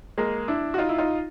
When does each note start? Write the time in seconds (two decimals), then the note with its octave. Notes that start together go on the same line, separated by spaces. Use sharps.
0.18 G#3 A#3
0.48 D4 E4
0.74 F#4
0.78 D#4 F4
0.89 E4
0.98 D#4 F4